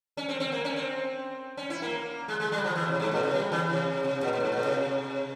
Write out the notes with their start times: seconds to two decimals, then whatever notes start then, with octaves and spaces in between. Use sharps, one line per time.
0.17 C#4
0.29 C4
0.40 C4
0.52 A#3
0.64 C#4
0.76 C4
1.57 C#4
1.70 E4
1.82 A#3
2.28 G#3
2.40 G#3
2.52 G3
2.64 F3
2.75 E3
2.88 C3
3.00 G#2
3.11 A#2
3.23 C3
3.34 G3
3.51 E3
3.70 C3
4.04 C3
4.23 A#2
4.33 A#2
4.40 G#2
4.52 A#2
4.64 C3